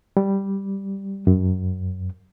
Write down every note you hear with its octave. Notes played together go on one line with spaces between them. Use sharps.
G3
F#2